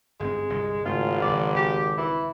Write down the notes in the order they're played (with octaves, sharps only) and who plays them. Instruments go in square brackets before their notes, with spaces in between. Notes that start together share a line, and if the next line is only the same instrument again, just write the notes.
[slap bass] G1 G#2 C4 [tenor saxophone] G#3
[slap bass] G1 C2 A#2
[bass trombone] G#1 [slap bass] G#2 C#3 A3 [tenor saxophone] F4
[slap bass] D#1 C#2 F3 [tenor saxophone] D5
[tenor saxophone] G4
E3